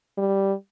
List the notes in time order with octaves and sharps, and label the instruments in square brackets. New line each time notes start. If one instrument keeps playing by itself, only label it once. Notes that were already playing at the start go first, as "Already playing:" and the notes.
[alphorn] G3